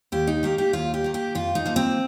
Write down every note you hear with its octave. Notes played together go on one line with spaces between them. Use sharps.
D#2 G4
D#4
D#3 A#3 G4
G4
D#2 F4
G4
D#3 A#3
G4
F2 F4
D#4
F3 A#3
C4